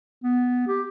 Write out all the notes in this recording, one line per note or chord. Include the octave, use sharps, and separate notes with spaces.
B3
G4